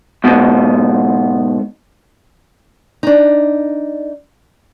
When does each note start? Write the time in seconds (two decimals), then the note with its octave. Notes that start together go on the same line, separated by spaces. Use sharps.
0.24 G#2 B2
3.03 D4 D#4